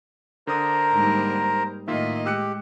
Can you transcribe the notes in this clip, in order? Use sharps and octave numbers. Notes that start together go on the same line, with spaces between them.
D3 D4 A#4 C5 A#5 D#6
G#2 G3 A#3
A2 D#3 A#3 F4 D#5 E5
G#3 G4 E6 F#6 C#7